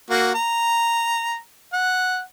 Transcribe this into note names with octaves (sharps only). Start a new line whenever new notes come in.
A#3 F#4
A#5
F#5